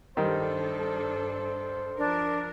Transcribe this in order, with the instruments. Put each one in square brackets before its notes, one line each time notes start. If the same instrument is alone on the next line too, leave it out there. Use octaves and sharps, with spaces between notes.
[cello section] G2 D4 A4 [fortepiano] D#3 G3 [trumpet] C5
[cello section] F3 A#4 [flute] D4